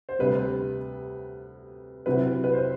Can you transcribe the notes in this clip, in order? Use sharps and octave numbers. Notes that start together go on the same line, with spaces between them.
C5
D2 C3 G3 B4
C3 F#3 C4 E4 B4
B4
C5